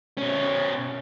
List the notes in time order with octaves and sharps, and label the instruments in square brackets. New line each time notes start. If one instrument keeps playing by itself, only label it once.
[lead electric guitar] B2 C#4